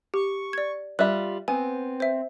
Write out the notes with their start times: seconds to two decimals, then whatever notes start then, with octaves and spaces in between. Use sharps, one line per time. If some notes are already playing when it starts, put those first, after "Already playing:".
0.14 G4 C#6
0.53 D5 G#6
0.99 G3 F4 E5 F#6
1.48 B3 C4 G#5
2.00 C5 E5